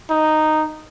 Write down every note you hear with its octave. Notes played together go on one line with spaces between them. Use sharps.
D#4